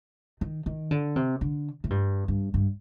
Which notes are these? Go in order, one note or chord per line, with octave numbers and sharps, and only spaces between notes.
D#3
D#3
D3
C3
D3
A2
G2
G2
G2